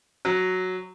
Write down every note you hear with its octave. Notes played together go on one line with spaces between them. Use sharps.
F#3